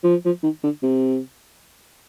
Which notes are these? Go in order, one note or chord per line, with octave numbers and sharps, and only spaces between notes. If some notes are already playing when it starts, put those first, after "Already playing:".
F3
F3
D#3
D3
C3